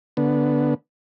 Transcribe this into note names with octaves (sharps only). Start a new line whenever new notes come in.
D3 B3